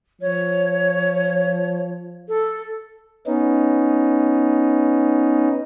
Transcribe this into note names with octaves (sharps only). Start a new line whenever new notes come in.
F3 C#5
A4
B3 C#4 D#4